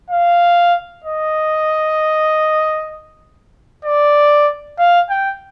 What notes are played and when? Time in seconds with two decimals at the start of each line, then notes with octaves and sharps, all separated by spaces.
0.10 F5
1.04 D#5
3.85 D5
4.79 F5
5.10 G5